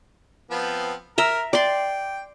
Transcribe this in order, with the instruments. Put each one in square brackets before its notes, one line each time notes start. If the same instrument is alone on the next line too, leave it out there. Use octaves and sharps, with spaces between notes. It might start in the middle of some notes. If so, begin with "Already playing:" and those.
[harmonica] F3 B3 C4
[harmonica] A#4 [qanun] E5 A#5
[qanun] D5 C6 [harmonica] G5